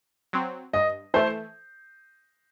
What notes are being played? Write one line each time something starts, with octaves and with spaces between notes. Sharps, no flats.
F#3 C4
G2 D#5
E3 A3 C5